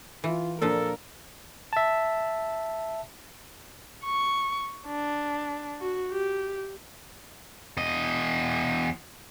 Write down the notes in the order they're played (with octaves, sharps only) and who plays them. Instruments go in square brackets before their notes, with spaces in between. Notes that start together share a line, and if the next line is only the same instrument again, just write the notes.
[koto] E3 [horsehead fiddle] F4
[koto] A#2 F3 [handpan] A#3 D4 [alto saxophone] A4 [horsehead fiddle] A#4
[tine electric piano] E5 A5
[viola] C#6
D4
F#4
G4
[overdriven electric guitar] E2 D#5